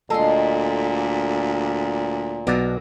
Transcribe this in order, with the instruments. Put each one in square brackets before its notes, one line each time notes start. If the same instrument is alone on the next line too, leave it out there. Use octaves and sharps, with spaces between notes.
[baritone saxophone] D2 [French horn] A#2 [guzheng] G#3 C6 [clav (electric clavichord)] A4
[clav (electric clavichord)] B1 B2 D5 [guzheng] F#3 A#4